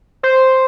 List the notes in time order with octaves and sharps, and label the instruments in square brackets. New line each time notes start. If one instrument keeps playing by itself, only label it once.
[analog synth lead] C5